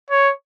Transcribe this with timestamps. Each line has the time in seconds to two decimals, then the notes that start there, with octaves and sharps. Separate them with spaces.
0.10 C#5